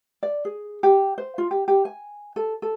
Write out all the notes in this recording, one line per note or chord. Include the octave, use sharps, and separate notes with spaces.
D5
G#4
G4
C5
F4
G4
G4
G#5
A4
A4